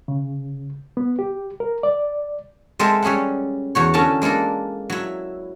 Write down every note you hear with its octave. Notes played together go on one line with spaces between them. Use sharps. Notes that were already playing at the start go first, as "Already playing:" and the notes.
C#3
B3
G4
A#4
D5
G#3 C4 A4 A#4 C5 E5
G3 C#4 G#4 E5 F#5
E2 F#4 C#5
D3 C#4 E4 A#4 A5
G#3 A#3 D4 A4 A#4
F#3 E4